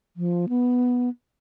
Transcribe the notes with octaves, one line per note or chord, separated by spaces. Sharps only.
F3
B3